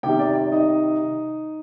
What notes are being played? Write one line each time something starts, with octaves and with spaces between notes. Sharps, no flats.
C3 D#3 G3 G4 G5
D5
D5
D#4 D#5